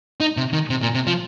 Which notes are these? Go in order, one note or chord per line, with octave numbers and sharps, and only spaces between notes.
D#4
C3
D#3
C3
A#2
C3
F3